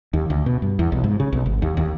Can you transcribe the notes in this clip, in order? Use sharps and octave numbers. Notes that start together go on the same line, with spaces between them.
D#2
D2
B2
G2
E2
B1
G#2
C#3
B1
G#1
D#2
D#2